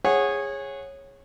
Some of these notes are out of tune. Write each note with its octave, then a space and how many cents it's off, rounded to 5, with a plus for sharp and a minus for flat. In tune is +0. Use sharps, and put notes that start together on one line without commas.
G#4 -15 C#5 -15 F#5 +0